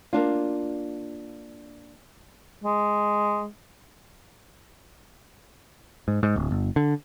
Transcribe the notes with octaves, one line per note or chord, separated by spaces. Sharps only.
A#3 D4 F4
G#3
G#2
G#2
D1
G1
D3